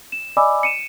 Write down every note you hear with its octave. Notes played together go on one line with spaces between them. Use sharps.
E7
D5 D#5 G#5 B5 D6 E6
C#7 D#7 E7